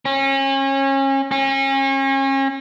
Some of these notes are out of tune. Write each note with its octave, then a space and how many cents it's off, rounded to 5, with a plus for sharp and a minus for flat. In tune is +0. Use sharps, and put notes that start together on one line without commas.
C#4 -30
C#4 -35